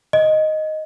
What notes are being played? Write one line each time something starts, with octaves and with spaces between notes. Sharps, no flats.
D#5